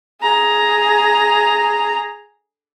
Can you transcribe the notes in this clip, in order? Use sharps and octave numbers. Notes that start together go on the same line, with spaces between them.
G#4 A#5